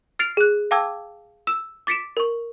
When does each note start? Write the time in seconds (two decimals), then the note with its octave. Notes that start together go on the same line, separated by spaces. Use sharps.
0.19 F6 A6 C7 D7 F7
0.37 G#4 F#6
0.71 F5 G5 A5 D6 E6 G#6
1.47 E6 E7
1.87 D6 A6 B6 C#7 D7 E7
2.17 A#4 C#6